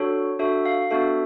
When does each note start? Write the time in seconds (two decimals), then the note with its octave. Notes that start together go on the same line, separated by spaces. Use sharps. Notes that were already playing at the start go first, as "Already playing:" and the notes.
Already playing: D4 F#4 A4 C#5
0.39 D4 F#4 A4 E5
0.66 F5
0.90 B3 D4 F#4 A4 E5